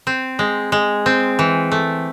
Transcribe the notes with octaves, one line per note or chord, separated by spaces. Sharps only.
C4
G#3
G#3
C4
E3
A3